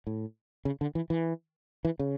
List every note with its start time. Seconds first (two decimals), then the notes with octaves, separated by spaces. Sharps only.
0.07 A2
0.65 C#3
0.81 D3
0.95 E3
1.10 E3
1.85 E3
1.99 C#3